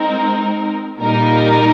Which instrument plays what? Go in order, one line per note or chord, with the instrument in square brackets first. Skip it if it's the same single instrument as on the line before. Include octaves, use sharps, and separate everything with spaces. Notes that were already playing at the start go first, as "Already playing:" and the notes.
Already playing: [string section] G#3 C4 D#4 A#4
A#2 G3 A#3 D#4 A#4